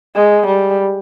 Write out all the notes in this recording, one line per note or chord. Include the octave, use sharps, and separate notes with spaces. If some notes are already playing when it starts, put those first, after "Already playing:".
G#3
G3